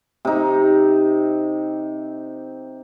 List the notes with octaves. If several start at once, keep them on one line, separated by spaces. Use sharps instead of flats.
C3 D#4